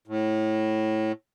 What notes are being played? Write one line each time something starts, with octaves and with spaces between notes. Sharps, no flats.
A2